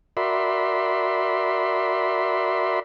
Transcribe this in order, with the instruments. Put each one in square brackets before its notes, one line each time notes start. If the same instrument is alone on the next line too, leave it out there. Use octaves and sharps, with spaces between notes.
[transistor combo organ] F#4 A#4 D5 E5 B5 C6